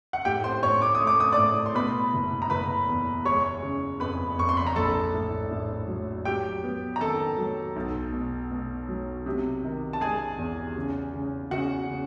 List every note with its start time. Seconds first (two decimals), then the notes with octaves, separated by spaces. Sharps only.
0.13 F#5
0.25 A2 G4 G5
0.44 C5 C6
0.63 A2 C#5 C#6
0.82 D6
0.95 D#6
1.00 A3
1.07 D6
1.20 D#6
1.32 A2 D5 D6
1.66 C6
1.75 B2 B4 B5
2.14 F#1
2.42 A#5
2.50 F#1 B4 B5
2.88 E2
3.25 G#3 C#5 C#6
3.62 C#3
4.00 F2 B4 B5
4.38 F2 C#6
4.49 C6
4.57 B5
4.67 A#5
4.76 A#1 A4 A5
5.14 A2
5.51 A2
5.88 F#3
6.25 F#3 G4 G5
6.64 B3
6.96 A#5
7.00 D#3 A4 A5
7.38 F#3
7.76 B1
8.13 B2
8.51 B2
8.89 F#3
9.26 C3
9.64 D#3
9.93 A5
10.01 G#3 G#4 G#5
10.38 E2
10.76 C#3
11.13 C#3
11.51 C#3 F#4 F#5
11.88 C#3